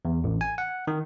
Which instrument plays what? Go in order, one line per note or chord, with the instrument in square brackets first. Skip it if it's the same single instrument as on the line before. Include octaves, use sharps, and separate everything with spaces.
[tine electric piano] E2
A1
G#5
F#5
D#3